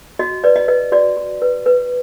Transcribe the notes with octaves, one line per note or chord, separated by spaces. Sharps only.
F#4 D#5
B4 D5
D#5
B4 D#5
F#4 D5
F#4
B4
B4